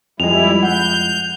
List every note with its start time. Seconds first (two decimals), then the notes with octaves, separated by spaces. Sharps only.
0.20 F2 G3 G#3 E4 F7
0.63 F#5 G6